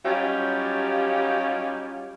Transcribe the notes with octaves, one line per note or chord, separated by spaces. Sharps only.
F#3 G3 C#4 D#4 F4 G4